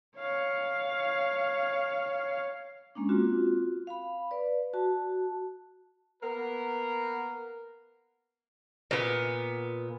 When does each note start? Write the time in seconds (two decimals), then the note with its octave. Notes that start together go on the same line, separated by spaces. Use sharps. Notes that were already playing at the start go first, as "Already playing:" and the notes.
0.17 C#5 F5
2.95 G#3 A#3 C#4 D4
3.09 C4 F4 F#4
3.87 F5 B5
4.31 B4 D5
4.73 F#4 A5
6.22 A#3 B3 A#4
8.91 A#2 B3